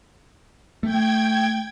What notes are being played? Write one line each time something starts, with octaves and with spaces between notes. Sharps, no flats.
A3 G5 G#6